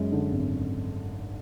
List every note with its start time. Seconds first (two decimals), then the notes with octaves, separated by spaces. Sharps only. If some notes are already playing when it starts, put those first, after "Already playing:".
Already playing: F#2 G#3
0.12 D3
0.32 G#1